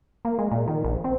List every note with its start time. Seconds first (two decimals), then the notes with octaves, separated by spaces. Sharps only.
0.25 A#3
0.39 G#3
0.52 A#2
0.68 D#3
0.84 A#1
1.04 C4